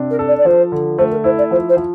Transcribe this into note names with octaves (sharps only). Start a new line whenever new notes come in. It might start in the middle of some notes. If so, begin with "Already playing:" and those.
Already playing: C3 D4
A#4
A4
D5
D5
F3 C5
D3
A3 C5
A#4
E4 C5
D5
F3 C5
C5
F3